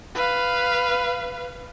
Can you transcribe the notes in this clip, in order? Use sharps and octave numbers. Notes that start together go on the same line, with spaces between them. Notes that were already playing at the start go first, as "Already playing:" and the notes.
B4 F5